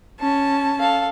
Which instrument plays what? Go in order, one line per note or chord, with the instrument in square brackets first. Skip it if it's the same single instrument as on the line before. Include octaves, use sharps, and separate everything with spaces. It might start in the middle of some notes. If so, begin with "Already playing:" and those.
[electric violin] C#4 [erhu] A5
[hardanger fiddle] A4 F5